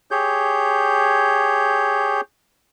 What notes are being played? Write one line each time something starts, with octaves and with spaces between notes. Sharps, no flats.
G4 G#4 C#5 G6